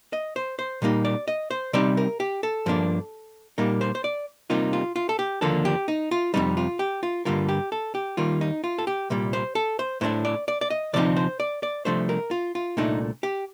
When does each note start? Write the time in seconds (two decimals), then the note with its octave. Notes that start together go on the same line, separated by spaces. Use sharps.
0.13 D#5
0.36 C5
0.59 C5
0.82 A#2 G3 A#3 D#4
1.05 D5
1.28 D#5
1.51 C5
1.73 C3 G3 C4 D#4 D5
1.97 A#4
2.20 G4
2.43 A4
2.66 G2 F3 A#3 D4
3.58 A#2 G3 A#3 D#4 A#4
3.81 C5
3.95 C5
4.04 D5
4.50 C3 G3 A#3 D#4 F4
4.73 F4
4.96 F4
5.09 A4
5.19 G4
5.41 D#2 D3 F3 A#3 D4 A4
5.65 G4
5.88 D#4
6.11 F4
6.34 F2 C3 G3 D#4
6.57 F4
6.79 G4
7.03 F4
7.25 G2 D3 G3 A#3 F4
7.49 G4
7.72 A4
7.95 G4
8.17 D#2 D#3 G3 A#3 F4
8.41 D#4
8.64 F4
8.78 A4
8.87 G4
9.10 C2 A#2 G3
9.33 C5
9.55 A4
9.79 C5
10.01 A2 A3 D4 C5
10.25 D5
10.48 D5
10.61 D5
10.70 D#5
10.93 D2 C3 F3 C4 D#4 D5
11.16 C5
11.40 D5
11.63 D5
11.85 C2 A#2 F3 A3 D4 C5
12.09 A#4
12.31 F4
12.55 F4
12.77 C2 A#2 A3 D4 D#4
13.23 G4